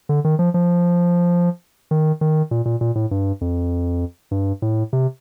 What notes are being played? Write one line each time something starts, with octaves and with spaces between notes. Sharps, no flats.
D3
D#3
F3
F3
D#3
D#3
A#2
A#2
A#2
A2
G2
F2
G2
A2
C3